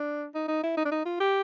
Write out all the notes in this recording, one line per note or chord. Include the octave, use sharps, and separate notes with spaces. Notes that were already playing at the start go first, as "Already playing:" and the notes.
Already playing: D4
D#4
D#4
E4
D#4
D4
D#4
F4
G4